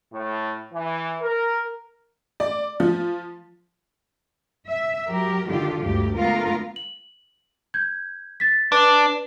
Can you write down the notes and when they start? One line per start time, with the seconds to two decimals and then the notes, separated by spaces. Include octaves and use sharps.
0.12 A2
0.72 E3
1.21 A#4
2.40 D5
2.80 F3
4.68 E5
5.08 F#3 G4 A#4
5.50 D3 D#3 F4 G4
5.83 D2 G2 G4
6.17 D3 A3 B3 F4 A#4
6.76 F#7
7.74 G6 G#6
8.40 A6 B6
8.72 D4 B4